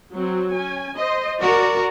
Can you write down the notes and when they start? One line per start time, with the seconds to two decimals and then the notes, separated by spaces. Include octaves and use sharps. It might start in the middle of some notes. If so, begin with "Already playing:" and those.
0.14 F#3 C4 F#4
0.54 C#4 G#5
0.99 C5 D#5 C6
1.41 F#4 A#4 D5